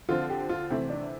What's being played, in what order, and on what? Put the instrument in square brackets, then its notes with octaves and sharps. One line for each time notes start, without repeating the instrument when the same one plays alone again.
[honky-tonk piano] D3 F3 C4 [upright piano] F4
[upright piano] G4
F4
[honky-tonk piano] C3 E3 A3 [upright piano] C4
[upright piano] D4